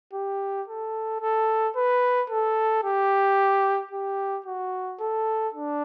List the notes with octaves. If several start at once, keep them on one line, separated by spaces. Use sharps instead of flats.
G4
A4
A4
B4
A4
G4
G4
F#4
A4
D4